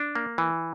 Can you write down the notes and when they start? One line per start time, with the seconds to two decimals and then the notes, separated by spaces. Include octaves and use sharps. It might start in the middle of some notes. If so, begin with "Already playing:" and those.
Already playing: D4
0.15 A#3
0.38 E3